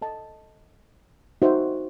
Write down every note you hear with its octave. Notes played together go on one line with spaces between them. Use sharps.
A4 D#5 A5
D#4 F#4 C5 E5